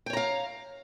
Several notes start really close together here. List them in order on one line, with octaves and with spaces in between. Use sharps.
G5 C#5 A#5 F5